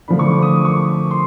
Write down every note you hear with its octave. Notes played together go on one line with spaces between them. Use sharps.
D3 F3 A3 B5
C#6
D6
D#6
D6
C#6
C6